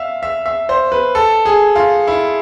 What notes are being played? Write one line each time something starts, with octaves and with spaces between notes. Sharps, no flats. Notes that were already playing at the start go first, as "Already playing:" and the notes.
Already playing: E5 F5
E5
E5
C5
B4
A4
G#4
F4
E4